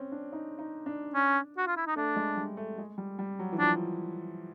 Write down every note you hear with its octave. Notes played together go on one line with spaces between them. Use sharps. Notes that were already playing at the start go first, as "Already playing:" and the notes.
Already playing: C4 C#4
D4
D#4
D#4
D4
C#4
F#4
F4
E4
D#4
A3 D4
G#3
G3
A3
G#3
G3
G3
F#3
E3
F3 D4